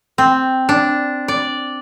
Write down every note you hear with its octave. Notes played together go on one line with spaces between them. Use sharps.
C4
D4
D5